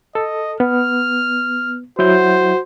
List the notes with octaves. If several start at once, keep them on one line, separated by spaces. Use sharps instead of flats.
A4 D#5
B3 F6
F#3 E4 F#4 C5 G6